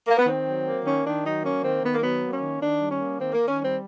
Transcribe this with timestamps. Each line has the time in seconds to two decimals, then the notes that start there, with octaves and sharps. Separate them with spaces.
0.08 A#3
0.17 B3
0.26 D#3 C4
0.45 F#3
0.66 A#3
0.85 D#3 C#4
1.04 D#3 D4
1.24 F#3 D#4
1.42 A#3 C#4
1.62 D#3 C4
1.82 D#3 B3
1.95 A#3
2.01 F#3 B3
2.21 A#3
2.30 C#4
2.40 D#3
2.60 D#3 D4
2.79 G3
2.89 C#4
2.99 A#3
3.18 D#3 C4
3.33 A#3
3.38 D#3
3.47 C#4
3.58 G3 C4